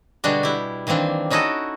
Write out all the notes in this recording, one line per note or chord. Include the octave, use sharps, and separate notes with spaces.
B2 D3 G3 G#3 D4 F#4
E4 G4
D#3 E3 A#3 C4 D4
C#4 D#4 E4 F#4 A4 D#5